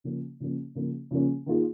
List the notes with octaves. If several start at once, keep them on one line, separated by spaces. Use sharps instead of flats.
C#3 F3 A#3 C#4
C#3 F3 A#3 C#4
C#3 F3 A#3 C#4
C#3 F3 A#3 C#4
D#3 A#3 F4 G#4